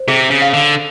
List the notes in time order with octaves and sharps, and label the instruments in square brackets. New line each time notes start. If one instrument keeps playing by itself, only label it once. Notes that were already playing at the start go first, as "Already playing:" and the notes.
Already playing: [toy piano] C5
[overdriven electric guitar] C3 [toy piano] G#4
[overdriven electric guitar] C#3
[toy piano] F5
[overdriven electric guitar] D3